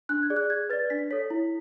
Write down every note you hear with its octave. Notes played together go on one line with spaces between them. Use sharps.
D4 F#6
G#6
G#4 D5
F#6
G#4 G#6
B4 D5 A6
D4 B6
A4 C#5 B6
E4